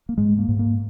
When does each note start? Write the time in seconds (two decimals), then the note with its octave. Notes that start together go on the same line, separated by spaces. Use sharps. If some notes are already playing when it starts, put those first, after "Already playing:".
0.09 A#3
0.18 G#2 G#3
0.39 A#3
0.49 G#2
0.59 A#3